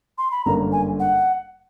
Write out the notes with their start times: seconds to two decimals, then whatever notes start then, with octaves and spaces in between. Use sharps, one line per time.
0.18 C6
0.31 B5
0.45 G1 F#2 D3 G3 A#3 A#5
0.72 G#5
1.00 F#5